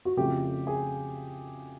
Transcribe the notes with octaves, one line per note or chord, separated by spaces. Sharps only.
F#4
F2 C#3 F3 A3 G4
G#4